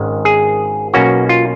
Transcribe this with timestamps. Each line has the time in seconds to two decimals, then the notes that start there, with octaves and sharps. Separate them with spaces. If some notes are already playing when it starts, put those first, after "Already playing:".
Already playing: G#1 G#2 D#3 G#3 C#4
0.25 G#4
0.94 B1 B2 A#3 C#4 F#4
1.29 F4